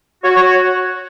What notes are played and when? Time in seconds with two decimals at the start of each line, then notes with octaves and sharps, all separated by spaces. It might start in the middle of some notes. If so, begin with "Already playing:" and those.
0.24 F#4 C#5
0.36 C#5